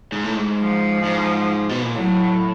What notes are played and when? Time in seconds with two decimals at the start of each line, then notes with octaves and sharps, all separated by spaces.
0.12 G#2
0.24 A2
0.36 G#2
0.59 F3
1.04 G#2
1.70 B2
1.82 A#2
1.95 A2 F#3